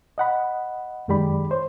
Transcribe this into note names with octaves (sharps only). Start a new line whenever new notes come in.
D#5 F#5 B5
F#2 D#3 G#3 G4 D5 B5
C5 C#5